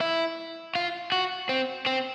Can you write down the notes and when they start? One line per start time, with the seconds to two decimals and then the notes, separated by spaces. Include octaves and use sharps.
0.01 E4
0.75 F4
1.12 F#4
1.49 C4
1.86 C4